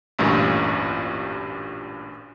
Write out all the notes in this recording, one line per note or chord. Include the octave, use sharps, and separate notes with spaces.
A1 D2 G2 A#2